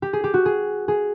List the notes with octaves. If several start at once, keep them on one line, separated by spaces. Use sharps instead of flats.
G4
G#4
G4
F#4
G#4
G#4